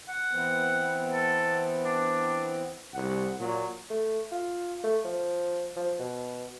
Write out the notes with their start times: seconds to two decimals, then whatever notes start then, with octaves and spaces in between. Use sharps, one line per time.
0.09 F#5
0.31 E3 B3 C4
1.13 A4
1.85 D4
2.94 C2 F#5
3.40 A#2 F#3
3.90 A3
4.32 F4
4.84 A3
5.05 F3
5.76 F3
5.99 B2